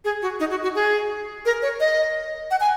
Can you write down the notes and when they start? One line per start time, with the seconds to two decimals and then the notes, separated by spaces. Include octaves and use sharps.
0.05 G#4
0.22 F#4
0.40 D#4
0.51 F#4
0.63 F#4
0.75 G#4
1.46 A#4
1.62 C#5
1.80 D#5
2.51 F#5
2.60 G#5